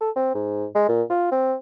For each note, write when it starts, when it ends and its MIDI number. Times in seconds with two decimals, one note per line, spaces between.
0.01 0.10 69
0.16 0.32 60
0.35 0.66 44
0.75 0.84 56
0.89 1.03 46
1.10 1.31 65
1.31 1.55 60